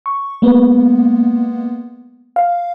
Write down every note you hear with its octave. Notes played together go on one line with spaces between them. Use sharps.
C#6
G#3 A#3 B3
F5